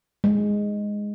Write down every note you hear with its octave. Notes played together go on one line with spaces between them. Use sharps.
G#3